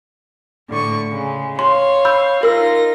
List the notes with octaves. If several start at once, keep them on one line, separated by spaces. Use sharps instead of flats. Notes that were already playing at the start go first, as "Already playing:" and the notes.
A2 D3 C#6
C#3 G#3
C#5 F5 C6
B5 E6 G6
D#4 F4 A#4 E6 A#6